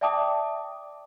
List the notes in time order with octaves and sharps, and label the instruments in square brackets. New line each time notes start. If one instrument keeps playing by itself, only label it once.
[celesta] D5 E5 G5 A5 D6 D#6